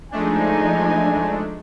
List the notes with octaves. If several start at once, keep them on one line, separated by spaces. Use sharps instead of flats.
F3 G#3 A3 D4 D#4 G#5